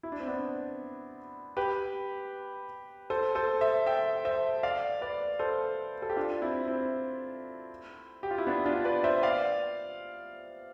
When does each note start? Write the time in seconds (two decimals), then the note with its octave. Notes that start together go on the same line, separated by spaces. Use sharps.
0.03 E4
0.12 D4
0.20 C4
0.28 B3 D4
1.57 G4 B4
3.10 A4 C5
3.35 A4 C5
3.61 C5 E5
3.86 E5 G5
4.25 C5 E5
4.63 D5 F5
5.01 B4 D5
5.39 A4 C5
6.02 A4
6.09 G4
6.16 D4 F4
6.42 C4 E4
6.68 C4 E4
8.23 G4
8.31 F4
8.38 E4
8.46 B3 D4
8.66 D4 F4
8.85 B4 D5
9.04 C5 E5
9.23 D5 F5